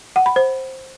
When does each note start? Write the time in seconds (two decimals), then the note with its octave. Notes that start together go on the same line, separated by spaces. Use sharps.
0.16 F#5
0.26 B5
0.36 C5